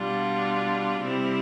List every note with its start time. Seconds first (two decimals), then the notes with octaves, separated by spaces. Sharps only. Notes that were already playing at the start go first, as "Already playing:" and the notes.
Already playing: B2 G3 D4 F4
1.02 C3 G3 C4 E4